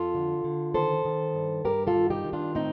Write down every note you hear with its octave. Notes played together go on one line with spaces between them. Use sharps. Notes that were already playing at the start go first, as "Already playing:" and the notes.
Already playing: F2 F4 A4
D3
D3
D#3 A4 C5
D#3
G2
G2 G4 A#4
F4 A4
D#3
D#4 G4
D#3
D4 F4
A2 C4 D#4